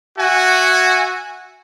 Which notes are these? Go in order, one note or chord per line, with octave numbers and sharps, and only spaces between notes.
F#4 E5 F#5 G#5